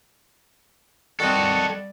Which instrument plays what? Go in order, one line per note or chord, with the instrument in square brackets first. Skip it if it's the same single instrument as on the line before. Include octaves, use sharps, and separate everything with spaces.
[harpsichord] D#3 C4 [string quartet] G3 D5 [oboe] F#4 [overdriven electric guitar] A4 D#5